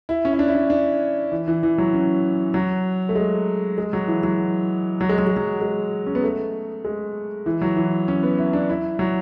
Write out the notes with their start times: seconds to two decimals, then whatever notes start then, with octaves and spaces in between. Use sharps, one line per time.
0.09 E4
0.25 C#4
0.33 E4
0.39 D4
0.48 E4
0.55 D4
0.70 D4
1.32 E3
1.48 E3
1.63 E3
1.78 F#3
1.94 C#4
2.54 F#3
3.09 A3
3.15 G#3
3.78 G#3
3.93 F#3
4.08 E3
4.23 F#3
5.01 F#3
5.09 G#3
5.18 F#3
5.27 G#3
5.37 F#3
5.61 G#3
6.06 C#4
6.15 B3
6.24 A3
6.85 G#3
7.46 E3
7.62 F#3
7.77 E3
8.08 C#4
8.23 B3
8.38 E4
8.53 D4
8.69 E4
8.99 F#3